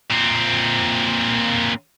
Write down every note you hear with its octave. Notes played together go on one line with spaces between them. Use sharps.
A#2 C4